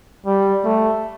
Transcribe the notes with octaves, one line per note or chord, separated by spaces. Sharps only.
G3
A3